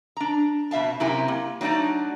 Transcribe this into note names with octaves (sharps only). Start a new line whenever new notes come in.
D4 A#5
F2 B2 E5 F5 A5
F#2 C3 E4 G4 A#4 G#5
A#3
F#3 A3 D4 D#4 D5